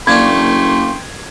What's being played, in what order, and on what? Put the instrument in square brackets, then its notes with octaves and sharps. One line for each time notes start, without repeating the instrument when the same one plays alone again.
[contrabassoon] F#1 [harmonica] A3 G5 C6 [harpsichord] A#3 C#4 D4 [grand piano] G#6